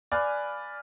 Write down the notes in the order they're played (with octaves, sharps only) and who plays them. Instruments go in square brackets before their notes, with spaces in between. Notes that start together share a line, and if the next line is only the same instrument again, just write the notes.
[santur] B4 F5 G#5 [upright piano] D5